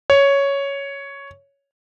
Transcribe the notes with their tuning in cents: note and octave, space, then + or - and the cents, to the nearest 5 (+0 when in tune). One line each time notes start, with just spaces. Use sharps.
C#5 +5